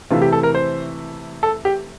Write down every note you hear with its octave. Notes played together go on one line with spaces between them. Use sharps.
C3 E3 A3 F4
G4
A4
A#4
C5
A4
G4